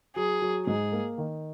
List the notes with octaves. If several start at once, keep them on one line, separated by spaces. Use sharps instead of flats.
F#3 G#4
F#3
G#2 G#4
A#3
D#3